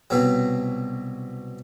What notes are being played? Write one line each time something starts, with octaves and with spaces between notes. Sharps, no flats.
C2 B2 F#3